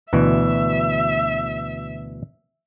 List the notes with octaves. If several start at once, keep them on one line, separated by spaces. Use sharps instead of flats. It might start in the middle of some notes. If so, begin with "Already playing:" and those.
D2 B2 E3 E5